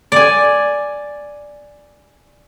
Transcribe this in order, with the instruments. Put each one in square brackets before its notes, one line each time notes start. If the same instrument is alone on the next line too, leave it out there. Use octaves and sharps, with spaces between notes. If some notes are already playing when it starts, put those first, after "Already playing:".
[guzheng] D5 G#5